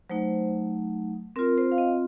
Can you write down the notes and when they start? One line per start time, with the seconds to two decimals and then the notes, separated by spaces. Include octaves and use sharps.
0.10 F#3 A3 D#4 C5
1.36 C4 F4 A#4
1.58 C5
1.71 F5
1.78 D#5